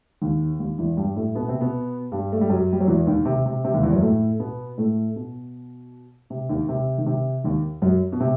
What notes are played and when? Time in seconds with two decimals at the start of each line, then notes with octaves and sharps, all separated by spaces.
0.21 D#2 D#3
0.59 D#2 D#3
0.78 E2 E3
0.97 G2 G3
1.16 A2 A3
1.35 B2 B3
1.48 C3 C4
1.61 B2 B3
2.12 G2 G3
2.32 A3
2.41 G3
2.49 F#2 F#3
2.73 G3
2.81 F#3
2.88 E2 E3
3.07 D#2 D#3
3.25 C3
3.46 C3
3.64 C3
3.73 D#2 D#3
3.83 E2 E3
3.92 F#2 F#3
4.02 A2 A3
4.40 B2 B3
4.78 A2 A3
5.16 B2
6.30 C3
6.49 D#2 D#3
6.69 C3
6.98 D#3
7.06 C3
7.44 D#2 D#3
7.82 F#2 F#3
8.12 B2
8.20 C3